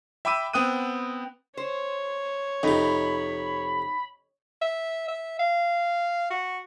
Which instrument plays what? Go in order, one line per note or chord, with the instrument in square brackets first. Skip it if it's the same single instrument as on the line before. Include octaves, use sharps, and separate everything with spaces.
[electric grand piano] E5 G5 B5 D6 E6 D#7
B3 C4 G5 D#6 F#6 D#7
[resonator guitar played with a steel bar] C5 [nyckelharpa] C#5
[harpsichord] F2 C3 [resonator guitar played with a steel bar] D#4 [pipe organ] B5
[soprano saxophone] E5
E5
F5
F#4